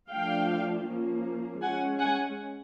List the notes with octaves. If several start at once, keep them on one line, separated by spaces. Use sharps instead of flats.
F3 A3 D4 F5 G5
F3 A#3 C#4
G#3 C#4 F#5 G#5
F#5 G#5